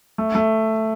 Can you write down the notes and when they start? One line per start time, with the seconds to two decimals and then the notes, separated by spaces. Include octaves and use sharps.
0.18 A3
0.35 A3